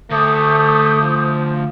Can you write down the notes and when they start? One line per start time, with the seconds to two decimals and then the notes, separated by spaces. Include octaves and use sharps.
0.11 D2 A3 D6 D#6 G6
1.02 F3